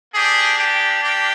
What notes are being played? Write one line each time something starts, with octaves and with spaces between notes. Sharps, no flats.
A#3 D4 G4 G#4
G4
G4